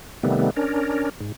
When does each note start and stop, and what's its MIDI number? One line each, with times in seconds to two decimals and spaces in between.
0.23 0.50 48
0.23 0.50 51
0.23 0.50 55
0.23 0.50 57
0.23 0.50 59
0.57 1.09 61
0.57 1.09 62
0.57 1.09 70
1.20 1.32 44